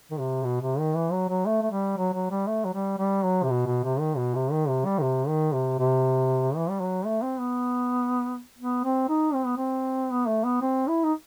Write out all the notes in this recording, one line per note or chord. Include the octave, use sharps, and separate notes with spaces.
D#3
C3
B2
C3
D#3
E3
F#3
F#3
A3
A3
G3
F#3
F#3
G3
A3
F#3
G3
G3
F#3
C3
B2
B2
C3
D#3
B2
C3
D#3
C3
G3
D#3
C3
D#3
C3
C3
E3
G3
F#3
A3
C4
B3
B3
C4
D#4
C4
B3
C4
B3
A3
B3
C4
E4
D#4